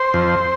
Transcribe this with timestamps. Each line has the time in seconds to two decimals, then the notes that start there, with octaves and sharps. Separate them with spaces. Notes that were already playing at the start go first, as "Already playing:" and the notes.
Already playing: C5
0.14 F2